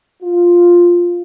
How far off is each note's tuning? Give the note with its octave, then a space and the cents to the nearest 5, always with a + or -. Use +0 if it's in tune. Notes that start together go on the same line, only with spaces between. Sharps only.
F4 +0